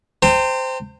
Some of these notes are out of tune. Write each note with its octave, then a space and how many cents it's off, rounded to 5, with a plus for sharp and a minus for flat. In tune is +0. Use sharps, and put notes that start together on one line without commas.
C5 -10 G5 +15 A#5 -45